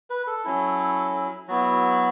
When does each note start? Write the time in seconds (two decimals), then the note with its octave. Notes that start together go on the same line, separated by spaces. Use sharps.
0.10 B4
0.27 A4
0.44 F#3 C#4 E4
1.48 F#3 B3 E4 F#4